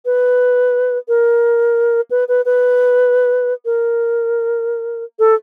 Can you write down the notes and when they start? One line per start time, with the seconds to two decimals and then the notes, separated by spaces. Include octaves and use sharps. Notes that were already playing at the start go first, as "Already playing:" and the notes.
0.05 B4
1.08 A#4
2.10 B4
2.28 B4
2.45 B4
3.65 A#4
5.19 A4